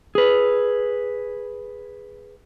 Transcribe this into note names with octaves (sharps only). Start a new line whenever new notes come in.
G#4 B4